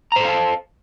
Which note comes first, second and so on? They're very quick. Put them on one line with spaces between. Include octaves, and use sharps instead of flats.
A#5 C5 A4 F5 A5